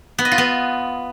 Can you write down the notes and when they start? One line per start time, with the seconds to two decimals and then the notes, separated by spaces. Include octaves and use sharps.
0.18 B3
0.25 D#5
0.31 F4
0.38 B3